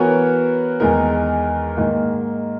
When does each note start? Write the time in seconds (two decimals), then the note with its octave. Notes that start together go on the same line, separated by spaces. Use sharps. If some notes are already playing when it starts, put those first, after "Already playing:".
Already playing: E3 B3 F#4 A#4 C#5
0.80 E2 D#3 G#3 D#4 A#4
1.77 G#2 D#3 A#3